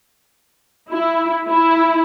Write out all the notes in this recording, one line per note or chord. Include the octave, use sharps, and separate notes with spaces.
E4
E4